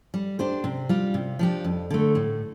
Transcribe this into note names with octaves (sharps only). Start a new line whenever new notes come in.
G3
D4 G4 C5
C3
G3 F4
C3
F3 D4 G4
F2
D3 A3
A2